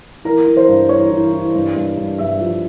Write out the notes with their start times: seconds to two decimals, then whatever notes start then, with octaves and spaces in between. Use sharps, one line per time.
0.25 E3 A#4
0.46 E3
0.57 C5
0.68 G2
0.89 E3 C#5
1.11 E3
1.33 E3
1.54 G2
1.76 G2
1.97 G2
2.18 G2 E5
2.41 F3